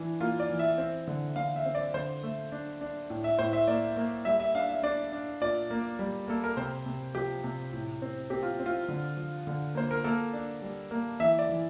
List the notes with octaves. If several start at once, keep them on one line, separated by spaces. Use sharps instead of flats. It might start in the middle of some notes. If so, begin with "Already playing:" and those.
Already playing: E3 D4
A#3 F4
D5
E3
E5
C4
D3
D3 F5
E5
C4
D5
D3 C5
A3
D4
D4
A2
E5
A2 C5
E5
A#3 D5
A#3
G3 E5
E5
D4 F5
E5
D4 D5
D4
A#2 D5
A#3
G3
A#3 A4
A#4
C3 C5
C3
F3 G4
C3
A2
C4
C4 G4
F4
C4
F4
D3
F3
D3
A#3 C5
A#4
A#3 A4
D4
G3
A#3
E3 E5
D5
E3